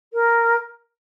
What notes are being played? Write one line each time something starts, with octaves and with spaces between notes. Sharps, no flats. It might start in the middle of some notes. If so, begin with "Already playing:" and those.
A#4